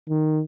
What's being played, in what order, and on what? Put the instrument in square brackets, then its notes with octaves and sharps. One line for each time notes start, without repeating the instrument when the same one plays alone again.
[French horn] D#3